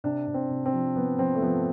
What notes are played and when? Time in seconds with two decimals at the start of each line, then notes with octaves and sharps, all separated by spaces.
0.04 C3 D4
0.27 C3
0.34 C4
0.50 C3
0.66 C4
0.73 F3
0.96 F3 B3
1.19 F3 C4
1.35 A3
1.42 F3 B3